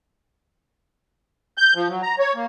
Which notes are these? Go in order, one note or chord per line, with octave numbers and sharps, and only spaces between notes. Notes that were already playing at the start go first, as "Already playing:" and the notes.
G6
F3
F#3
A#5
C#5
A#3